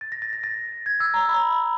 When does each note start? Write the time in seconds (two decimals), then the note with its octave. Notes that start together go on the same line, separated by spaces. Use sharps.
0.01 A6
0.12 A#6
0.22 A6
0.33 A#6
0.44 A6
0.86 G#6
1.00 E6
1.14 A#5
1.29 B5